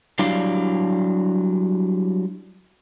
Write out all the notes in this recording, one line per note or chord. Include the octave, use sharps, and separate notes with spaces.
F#3 G3 D4 E4 D5 F5